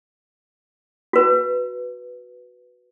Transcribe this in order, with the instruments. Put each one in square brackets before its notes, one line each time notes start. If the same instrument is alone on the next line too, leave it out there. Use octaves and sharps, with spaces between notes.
[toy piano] F#4 B4